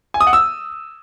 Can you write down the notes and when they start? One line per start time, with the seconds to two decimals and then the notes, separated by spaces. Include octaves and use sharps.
0.14 G#5
0.21 D#6
0.27 F#5
0.33 E6